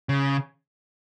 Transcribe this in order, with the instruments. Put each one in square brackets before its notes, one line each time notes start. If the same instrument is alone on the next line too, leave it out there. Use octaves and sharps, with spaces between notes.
[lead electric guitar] C#3